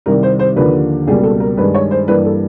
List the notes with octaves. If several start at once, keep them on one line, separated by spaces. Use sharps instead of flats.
C2 C3 D#3 G3 A#4
C5
C5
D#2 D3 F3 A#3 B4
C#2 B2 G3 A#3 G#4
A4
A#4
G2 D#3 G#3 B4
C#5
C5
G2 E3 G3 A#3 B4
A4